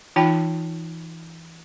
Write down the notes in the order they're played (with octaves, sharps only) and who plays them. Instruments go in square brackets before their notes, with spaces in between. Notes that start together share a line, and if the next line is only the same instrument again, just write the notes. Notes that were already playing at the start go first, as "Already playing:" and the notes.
[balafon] E3 D#4 F4 G5 A5